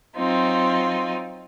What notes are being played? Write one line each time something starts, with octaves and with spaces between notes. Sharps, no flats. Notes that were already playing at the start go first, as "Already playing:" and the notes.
F#3 C4 D#4 F4